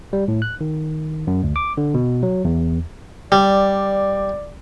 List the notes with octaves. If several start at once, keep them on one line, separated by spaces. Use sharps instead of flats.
G3
A2
F#6
D#3
F#2
D2
D6
D3
B2
F#3
E2
G3 D5